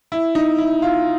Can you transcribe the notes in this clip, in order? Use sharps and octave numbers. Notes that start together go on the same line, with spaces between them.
E4
D#4
E4
F4